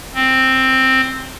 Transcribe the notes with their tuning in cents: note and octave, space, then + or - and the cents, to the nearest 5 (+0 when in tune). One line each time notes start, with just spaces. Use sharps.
C4 +5